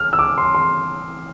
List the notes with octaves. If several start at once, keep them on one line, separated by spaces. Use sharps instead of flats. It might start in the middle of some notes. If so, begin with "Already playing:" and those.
Already playing: F6
E6
D6
C6
C6